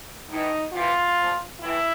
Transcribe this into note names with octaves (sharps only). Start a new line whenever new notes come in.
A2 E3 D#4
C3 E3 F4
A#2 F3
A2 E3 E4